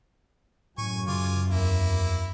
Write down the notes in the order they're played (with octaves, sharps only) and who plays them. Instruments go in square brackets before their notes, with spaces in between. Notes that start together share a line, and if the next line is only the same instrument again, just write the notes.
[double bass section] F#2 [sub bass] A2 [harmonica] G#5 C#6
[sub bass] C#3 [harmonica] F4 G#5 D6
[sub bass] E2 [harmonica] A#3 E4